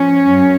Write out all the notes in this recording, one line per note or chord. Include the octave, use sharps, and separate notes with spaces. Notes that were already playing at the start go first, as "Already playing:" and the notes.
Already playing: F3 C#4
F#2